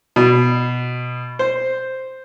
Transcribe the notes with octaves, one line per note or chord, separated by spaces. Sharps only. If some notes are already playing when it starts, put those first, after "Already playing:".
B2
C5